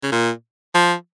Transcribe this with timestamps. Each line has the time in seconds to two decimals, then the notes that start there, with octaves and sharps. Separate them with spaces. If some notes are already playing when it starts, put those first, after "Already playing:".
0.03 C#3
0.12 A#2
0.75 F3